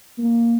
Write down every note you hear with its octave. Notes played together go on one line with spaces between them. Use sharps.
A#3